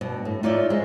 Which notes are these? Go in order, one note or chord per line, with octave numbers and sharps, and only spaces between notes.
G2 B2
A2
D#4 F4 C#5 D5 E5
G#2 G#3